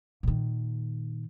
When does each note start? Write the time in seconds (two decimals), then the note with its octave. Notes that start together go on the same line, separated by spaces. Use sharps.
0.23 A#2 D#3